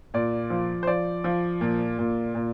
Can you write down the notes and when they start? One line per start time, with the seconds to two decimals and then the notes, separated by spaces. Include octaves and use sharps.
0.14 A#2 D5
0.50 F3
0.83 C5
0.87 F3 D5
1.24 F3
1.61 A#2
1.99 A#2
2.35 A#2